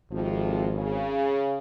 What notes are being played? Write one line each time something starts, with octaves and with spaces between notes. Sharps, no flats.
G#1 F2 C3 F3
C#3